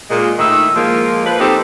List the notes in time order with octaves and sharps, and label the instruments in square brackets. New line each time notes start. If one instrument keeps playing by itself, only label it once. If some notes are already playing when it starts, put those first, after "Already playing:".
[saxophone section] A#2 G#3
A2 D#3 D#4 E5
F3 G#3 A#3
F3 B4
C4 D#4 G4 A4 C5